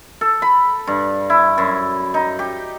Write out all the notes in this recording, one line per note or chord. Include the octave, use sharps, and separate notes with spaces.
A4
B5
G2
E4
F#2
D#4
G4